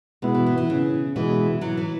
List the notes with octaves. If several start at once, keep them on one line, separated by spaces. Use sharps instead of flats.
B2 G#3 B3 E4
E3
E3
E3
C#3
B2 E3 G#3 E4
F#3
E3